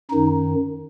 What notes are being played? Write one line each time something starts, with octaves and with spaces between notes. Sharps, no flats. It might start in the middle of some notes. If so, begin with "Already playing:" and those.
F#2 D#3 D#4